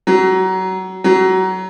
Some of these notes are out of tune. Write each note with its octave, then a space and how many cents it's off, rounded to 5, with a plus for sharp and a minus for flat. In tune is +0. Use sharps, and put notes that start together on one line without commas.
F#3 +25
F#3 +25